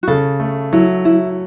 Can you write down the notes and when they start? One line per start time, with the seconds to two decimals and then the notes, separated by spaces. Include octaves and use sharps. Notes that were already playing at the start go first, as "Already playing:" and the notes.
0.03 F#4
0.08 C#3 A4
0.40 A3
0.73 F#3 E4
1.05 F#3 E4